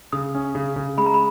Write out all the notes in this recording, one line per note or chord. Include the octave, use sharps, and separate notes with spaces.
C#3 D#6
C#4
C#3
C#3
G#3 B5
A#5
B5